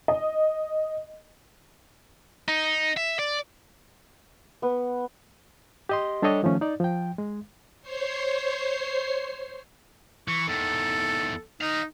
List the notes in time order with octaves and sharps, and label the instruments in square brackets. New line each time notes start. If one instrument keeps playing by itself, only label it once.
[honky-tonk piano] D#5
[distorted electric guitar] D#4
E5
D5
[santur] B3
[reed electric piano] G4 D#5 C6
G3 D4 G4 A4 C#5 D#5
D#3 F3 A3 C#4
D#4 D5
F3 G5
G#3
[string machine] C5 C#5 C7
[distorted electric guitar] E3 [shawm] C#6
[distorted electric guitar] E2 D#3 [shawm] A4
[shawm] D#4 [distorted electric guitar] D#5 F5